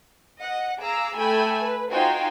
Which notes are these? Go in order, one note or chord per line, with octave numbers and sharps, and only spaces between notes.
D#5 F#5
G#4 F5 A#5 D6 E6
A3 G5 G#5 B5 E6
B4
D#4 F4 F#4 C5 G5 G#5